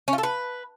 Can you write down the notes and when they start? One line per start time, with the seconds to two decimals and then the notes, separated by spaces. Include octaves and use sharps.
0.08 C#4
0.13 F4
0.18 A4
0.23 B4